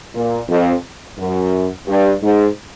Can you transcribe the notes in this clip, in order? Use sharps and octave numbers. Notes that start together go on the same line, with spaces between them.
A#2
F2
F#2
G2
G#2